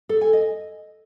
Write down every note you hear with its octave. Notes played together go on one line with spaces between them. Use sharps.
A4
G#5
D#5